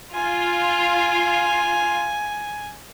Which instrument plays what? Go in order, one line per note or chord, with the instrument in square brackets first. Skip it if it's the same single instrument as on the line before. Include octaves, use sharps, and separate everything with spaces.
[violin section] F4 [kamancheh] G#5